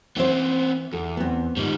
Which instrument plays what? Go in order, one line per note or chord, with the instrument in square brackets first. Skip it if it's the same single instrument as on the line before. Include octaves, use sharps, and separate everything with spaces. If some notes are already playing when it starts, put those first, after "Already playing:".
[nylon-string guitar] E3 E4 C5 [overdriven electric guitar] B3 C4
[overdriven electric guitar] E2 [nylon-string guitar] A4
[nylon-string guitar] B3 C4
[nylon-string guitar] G#2 [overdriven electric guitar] D#3 G3